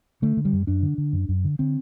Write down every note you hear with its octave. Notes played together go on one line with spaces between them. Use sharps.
D3 A3
D3
G3
F#2
F#2 D4
D3
D3
F#2
F#2
D3
D3 C4